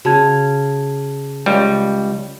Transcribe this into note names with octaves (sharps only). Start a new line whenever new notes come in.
C#3 F#4 A5 G#6
C#2 G3